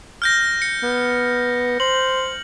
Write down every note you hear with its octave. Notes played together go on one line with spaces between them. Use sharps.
F6 G6 A#6
C#7
B3
C5 F#7